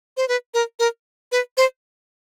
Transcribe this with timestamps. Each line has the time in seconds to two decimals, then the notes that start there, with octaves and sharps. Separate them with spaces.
0.17 C5
0.28 B4
0.54 A#4
0.79 A#4
1.32 B4
1.57 C5